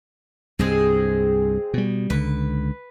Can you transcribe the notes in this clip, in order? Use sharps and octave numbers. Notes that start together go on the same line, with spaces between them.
C2 G2 G#3 C4 G#4
B2 G3
C#2 D3 B4